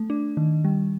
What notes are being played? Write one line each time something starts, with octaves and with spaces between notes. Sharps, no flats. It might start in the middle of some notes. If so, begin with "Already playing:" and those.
Already playing: A3
D4
D#3
G3